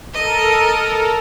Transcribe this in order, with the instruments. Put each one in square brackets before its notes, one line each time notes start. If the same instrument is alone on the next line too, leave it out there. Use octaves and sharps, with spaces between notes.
[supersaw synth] A4 A#4 [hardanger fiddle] D#5 D#6